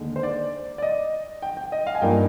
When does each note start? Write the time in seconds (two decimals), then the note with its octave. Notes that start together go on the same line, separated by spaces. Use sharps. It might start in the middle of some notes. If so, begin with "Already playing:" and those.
Already playing: D#2 D3 G#3 D#4
0.16 C5
0.23 D5
0.78 D5
0.82 D#5
1.42 G5
1.57 G5
1.72 D#5
1.87 F5
1.95 G#5
2.02 G2 F3 A#3 D#4 G5